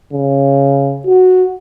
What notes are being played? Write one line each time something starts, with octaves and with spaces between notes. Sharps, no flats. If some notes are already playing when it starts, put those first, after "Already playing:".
C#3
F#4